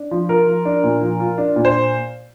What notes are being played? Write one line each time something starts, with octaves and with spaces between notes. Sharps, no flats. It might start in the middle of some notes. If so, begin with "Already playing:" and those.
Already playing: D4
F3
F4 A#4
F3
D4
A#2
F3
F4
D4
A#2
C5